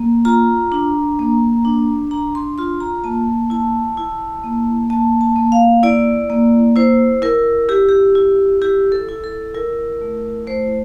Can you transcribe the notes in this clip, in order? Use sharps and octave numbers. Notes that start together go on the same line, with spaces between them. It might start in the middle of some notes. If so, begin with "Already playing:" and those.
Already playing: A#3
F4 A#5
D4
A#3
D4
D4 A#5
C6
F4 C6
A#5
A#3 A5
E4 A5
E4
A#3
A#3 A5
A5
A#3
F5
E4 D5
A#3
E4 C5
E4 A#4
E4 G4
G4
E4
E4 G4
A4
E4
A4
E4 A#4
A3
A3 C5